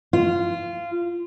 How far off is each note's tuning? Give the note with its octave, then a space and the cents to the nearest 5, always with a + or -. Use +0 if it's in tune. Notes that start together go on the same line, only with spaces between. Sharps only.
F4 -15